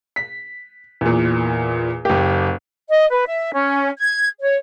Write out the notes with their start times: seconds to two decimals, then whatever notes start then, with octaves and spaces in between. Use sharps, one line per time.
0.16 B6
1.01 E2 A#2
2.05 F#1 G4
2.90 D#5
3.11 B4
3.27 E5
3.53 C#4
3.99 G#6
4.40 C#5